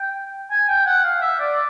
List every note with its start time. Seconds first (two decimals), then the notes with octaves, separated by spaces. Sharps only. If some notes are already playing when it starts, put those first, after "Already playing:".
Already playing: G5
0.50 G#5
0.68 G5
0.86 F#5
1.04 F5
1.21 E5
1.39 D5